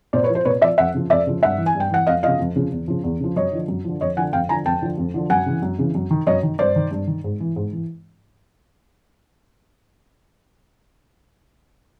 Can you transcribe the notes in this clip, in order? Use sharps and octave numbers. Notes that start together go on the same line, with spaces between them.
A#2 C5 D5
B4 C#5
F3
C5
A#2 B4 C#5
F3 D5 E5
F2 E5 F#5
C#3 F3
F2 D5 E5
C#3 F3
G2 E5 F#5
E3
G#5
G2
G5
E3 F#5
F2 D#5 F5
C#3 F3 D#5 F5
F2
C#3 F3
E2
C#3 F3
E2
C#3 F3
F#2 C#5 D#5
D3 F3
F#2
D3 F3
F2 C#5 D#5
D3 F3 F#5 G#5
F2 F5 G5
D3 F3 G#5 A#5
F2 G5 A5
D3 F3
F2
D3 F3
F#2 F#5 G#5
C#3 E3
F#2
C#3 E3
F#2
D#3
F#2 C#5 D#5
D#3
G2 C5 D5
D#3
G2
D#3
G#2
E3
G#2
E3